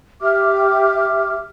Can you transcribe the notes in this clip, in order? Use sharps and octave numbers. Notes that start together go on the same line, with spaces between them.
G4 E5 D6 F6